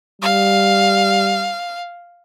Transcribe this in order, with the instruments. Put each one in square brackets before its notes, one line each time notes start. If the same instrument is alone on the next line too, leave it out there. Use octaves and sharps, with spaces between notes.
[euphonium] G3 [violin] F5